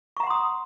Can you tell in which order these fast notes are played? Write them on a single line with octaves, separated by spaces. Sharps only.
C#6 A#5 F#5 C6 D#6